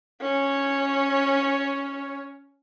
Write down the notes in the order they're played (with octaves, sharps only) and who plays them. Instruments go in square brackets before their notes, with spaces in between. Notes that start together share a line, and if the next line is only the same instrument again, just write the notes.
[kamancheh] C#4 C#5